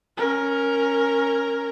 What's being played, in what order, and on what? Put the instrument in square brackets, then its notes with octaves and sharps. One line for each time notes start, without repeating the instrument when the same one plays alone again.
[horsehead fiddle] C#4 A#4